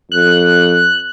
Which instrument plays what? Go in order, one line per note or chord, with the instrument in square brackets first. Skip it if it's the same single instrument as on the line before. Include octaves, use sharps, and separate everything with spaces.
[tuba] F2 [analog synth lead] F#6